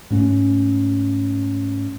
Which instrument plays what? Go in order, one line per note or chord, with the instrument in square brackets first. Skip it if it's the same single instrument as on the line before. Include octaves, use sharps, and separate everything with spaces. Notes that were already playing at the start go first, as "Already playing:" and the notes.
[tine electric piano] G#2 A3 C#4